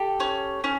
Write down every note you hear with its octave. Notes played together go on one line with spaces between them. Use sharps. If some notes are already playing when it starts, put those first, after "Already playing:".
Already playing: G4 A4
C#4
C#4